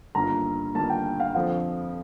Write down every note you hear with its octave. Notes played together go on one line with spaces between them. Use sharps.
G1 G2 D#3 A#3 F4 A#5
G1 G2 D#3 A#3 F4 A5
G5
F5
F2 D3 F3 C4 F4 F5